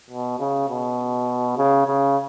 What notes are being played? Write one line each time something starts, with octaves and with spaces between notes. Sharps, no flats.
B2
C#3
B2
C#3
C#3